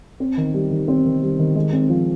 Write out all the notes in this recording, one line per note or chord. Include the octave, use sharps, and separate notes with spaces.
C4
D#3
G3
D#3
C4
D#3
G3
D#3
G#3
C4
F3